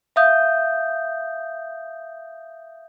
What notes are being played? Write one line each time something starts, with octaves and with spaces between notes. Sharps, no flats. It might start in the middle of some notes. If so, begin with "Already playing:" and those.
E5 F5 D#6 G6